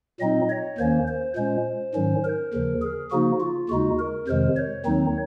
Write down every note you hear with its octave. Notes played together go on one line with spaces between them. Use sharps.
A#2 F#3 C4 D#4 D#5
C#5
D#2 D#3 A#3 C#4 C5
C5
A#2 G#3 C#4 C5
G#2 D#3 F#3 C#4
A#4
D#2 C#3 F3
G#4
C#3 F3 A#3 D#4 F#4
F4
D#2 C#3 G#3 D#4 F#4
A#4
F2 C3 D#3 G#3 C5
C#5
D#2 D#3 F#3 C4 D#4